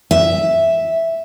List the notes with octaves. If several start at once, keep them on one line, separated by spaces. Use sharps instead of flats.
E5